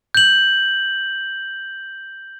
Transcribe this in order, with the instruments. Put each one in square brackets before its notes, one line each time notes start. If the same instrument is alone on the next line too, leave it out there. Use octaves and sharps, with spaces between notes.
[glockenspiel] G6 F#7